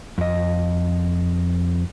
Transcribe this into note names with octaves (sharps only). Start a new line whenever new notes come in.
F2 D#5